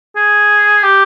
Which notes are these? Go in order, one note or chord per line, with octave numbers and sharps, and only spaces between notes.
G#4
G4